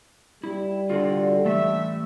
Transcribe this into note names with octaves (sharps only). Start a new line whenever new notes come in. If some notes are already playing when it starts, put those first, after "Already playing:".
G3 E4
D3 F4 F#4 D5
E3 A3 E5